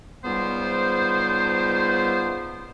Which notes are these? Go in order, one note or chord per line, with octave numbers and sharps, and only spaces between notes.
C#2 G#2 G3 B3 F4 C5